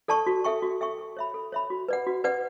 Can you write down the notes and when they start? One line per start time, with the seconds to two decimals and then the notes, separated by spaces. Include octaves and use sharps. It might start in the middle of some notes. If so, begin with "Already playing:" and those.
0.08 A4 D5 A5 C#6
0.27 F#4
0.44 A4 E5 G5 C#6
0.62 F#4
0.81 A4 E5 G5 C#6
0.98 A4
1.17 C#5 E5 B5
1.34 A4
1.52 C#5 E5 B5
1.70 F#4
1.89 B4 D5 F#5
2.06 F#4
2.24 B4 D5 F#5